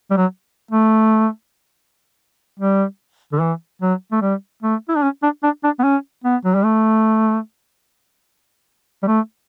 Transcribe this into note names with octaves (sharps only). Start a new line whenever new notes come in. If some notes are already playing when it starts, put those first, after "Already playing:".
G3
F#3
A3
G3
D3
E3
F#3
A3
G3
A3
E4
D4
C#4
D4
D4
D4
B3
C#4
B3
F#3
G3
A3
G3
A3